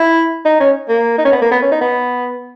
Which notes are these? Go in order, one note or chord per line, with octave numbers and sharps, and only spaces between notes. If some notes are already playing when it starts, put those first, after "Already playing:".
Already playing: E4
D#4
C#4
A#3
D#4
C#4
B3
A#3
B3
C#4
D#4
B3